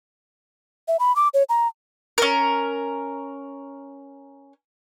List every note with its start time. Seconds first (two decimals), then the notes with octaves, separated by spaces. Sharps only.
0.88 E5
1.00 B5
1.16 D6
1.34 C#5
1.49 A#5
2.18 C#4 A#4